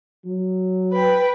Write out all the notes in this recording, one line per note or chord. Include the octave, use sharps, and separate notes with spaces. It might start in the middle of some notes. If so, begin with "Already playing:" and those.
F#3
B4 G5